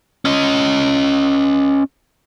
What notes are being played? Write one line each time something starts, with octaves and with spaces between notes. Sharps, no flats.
C#4 D#5